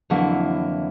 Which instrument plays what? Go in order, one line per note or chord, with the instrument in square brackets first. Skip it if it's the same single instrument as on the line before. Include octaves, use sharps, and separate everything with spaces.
[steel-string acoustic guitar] F2 D3 E3 F#3 A#3 E4